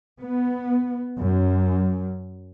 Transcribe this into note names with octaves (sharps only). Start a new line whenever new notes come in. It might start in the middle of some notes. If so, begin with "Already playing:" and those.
B3
F#2